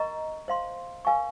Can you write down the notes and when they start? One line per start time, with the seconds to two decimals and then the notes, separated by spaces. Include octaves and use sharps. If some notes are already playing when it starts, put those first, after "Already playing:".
Already playing: A#4 D#5 A#5 C#6
0.48 C5 F5 C6
1.05 A#4 F5 G#5 C#6